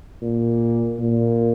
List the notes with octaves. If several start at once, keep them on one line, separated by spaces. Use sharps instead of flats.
A#2
A#2